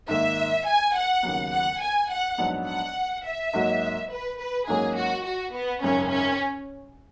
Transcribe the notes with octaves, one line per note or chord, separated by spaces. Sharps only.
G#2 D#3 A#3 E5
G#5
F#5
D#2 C#3 F#3 B3
F#5
G#5
F#5
A#1 G#2 F#3 B3
F#5
E5
G#2 F#3 A#3 D#4 F#4
B4
B4
G#2 F#3 A#3 C#4 G#4
F#4
F#4
B3
G#1 F#2 C#3 C#4
C#4